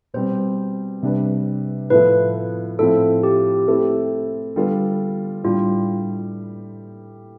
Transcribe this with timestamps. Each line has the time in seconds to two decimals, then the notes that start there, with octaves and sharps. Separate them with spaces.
0.14 B2 G3 C4 C5
1.03 C3 G3 D4 G4 B4
1.90 A2 F3 B3 E4 A4 B4
2.79 A2 F3 C4 E4 A4
3.23 G4
3.67 A3 C4 E4 A4
4.56 D3 G3 B3 F4 A4
5.44 A2 G3 D4 F4 G4